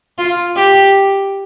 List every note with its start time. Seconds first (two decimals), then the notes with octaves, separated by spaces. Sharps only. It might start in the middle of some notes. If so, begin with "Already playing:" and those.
0.18 F4
0.56 G4